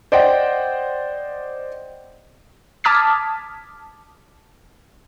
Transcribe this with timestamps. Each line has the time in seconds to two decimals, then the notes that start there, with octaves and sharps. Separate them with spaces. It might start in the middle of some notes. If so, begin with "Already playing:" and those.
0.12 C5 D5 D#5 F#5 G5
2.84 A5 D6 D#6 F6 G#6 B6